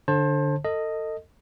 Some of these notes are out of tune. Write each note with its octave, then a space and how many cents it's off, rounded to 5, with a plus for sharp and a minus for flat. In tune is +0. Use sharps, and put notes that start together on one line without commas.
D3 +0 C5 +30 A5 +0
A4 +30 D#5 +0